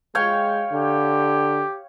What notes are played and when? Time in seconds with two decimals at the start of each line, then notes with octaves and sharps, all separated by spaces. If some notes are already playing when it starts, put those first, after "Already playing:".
0.15 G#3 C#5 F5 G5
0.71 D3 G4